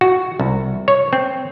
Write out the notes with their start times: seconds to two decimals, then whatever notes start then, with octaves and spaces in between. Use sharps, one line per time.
0.01 F#4
0.40 C2
0.88 C#5
1.13 C4